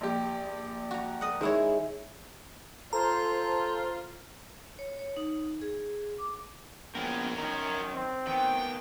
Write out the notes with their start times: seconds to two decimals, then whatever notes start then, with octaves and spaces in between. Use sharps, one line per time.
0.01 A#1 G4
0.91 F#4 A#5
1.21 A#4 D#5 F#5
1.41 D#3 G#3 E4 C#5
2.93 F4 A4 C5 A#5
4.79 C#5
4.99 C#5
5.17 D#4
5.62 G#4
6.19 D6
6.95 A#1 B3 C#4 A#4 G5
7.38 F#2 D#3 A#5
7.94 C4
8.27 D#3 B3 G5